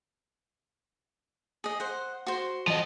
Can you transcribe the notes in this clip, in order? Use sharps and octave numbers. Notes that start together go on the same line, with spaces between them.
G#4 D#5
C5 F#5
F#4 C5
F3 D#5